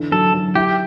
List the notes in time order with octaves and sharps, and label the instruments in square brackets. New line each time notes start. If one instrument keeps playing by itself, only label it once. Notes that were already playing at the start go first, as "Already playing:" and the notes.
Already playing: [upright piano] D3 E3
[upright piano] F#3 [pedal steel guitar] A4
[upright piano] F#3
[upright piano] E4 [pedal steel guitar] G4